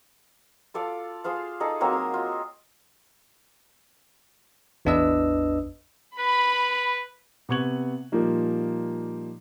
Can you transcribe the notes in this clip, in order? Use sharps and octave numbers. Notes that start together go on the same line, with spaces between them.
F4 A4 D5 F5
F4 G#4 C5 F5
D#4 G#4 A4 D5
F#3 A#3 C4 C#5
A#4 D#6
F4
A1 E2 D4 B4 D#5 E6
B4 B5
C3 B3 C#6 G#6 F#7
A#2 F3 G3 A#3 D#4